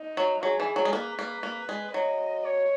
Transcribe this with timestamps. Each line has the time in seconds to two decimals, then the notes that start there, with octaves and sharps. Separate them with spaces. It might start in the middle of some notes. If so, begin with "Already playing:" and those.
Already playing: D#4
0.17 F#3
0.43 F#3 G#4
0.60 E3
0.76 F#3
0.85 G#3
0.92 A#3 B4
1.19 A#3
1.43 A#3
1.69 G#3
1.94 F#3 D#5
2.45 C#5